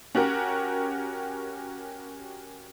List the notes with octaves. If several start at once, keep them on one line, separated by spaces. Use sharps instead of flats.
C#4 F#4 G4 A#4